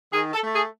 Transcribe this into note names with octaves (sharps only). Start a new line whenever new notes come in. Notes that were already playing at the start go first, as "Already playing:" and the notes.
D#3 G#4
A4
A3
G#4